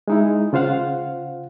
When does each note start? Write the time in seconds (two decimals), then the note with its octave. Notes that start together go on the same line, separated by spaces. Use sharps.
0.08 G#3 D#4 E4
0.53 C#3 F4 C5 F5 F#5